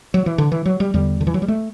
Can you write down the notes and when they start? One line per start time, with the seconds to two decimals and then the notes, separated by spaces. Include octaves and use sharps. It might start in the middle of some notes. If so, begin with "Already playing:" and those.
0.14 F#3
0.26 E3
0.38 D3
0.52 E3
0.65 F#3
0.80 G3
0.94 E2 D3 G3
1.21 D3
1.27 E3
1.34 F#3
1.42 G3
1.48 A3